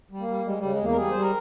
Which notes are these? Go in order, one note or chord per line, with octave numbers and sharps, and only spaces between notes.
G3
A#3
G3
G3 G#3
G3
C#3
G#3
E2 A#3
A#4
G3 G#4
G3 C5
A#4